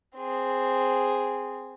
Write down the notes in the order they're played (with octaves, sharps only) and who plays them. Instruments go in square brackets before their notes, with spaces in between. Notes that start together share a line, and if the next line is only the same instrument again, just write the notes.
[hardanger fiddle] C4 G#4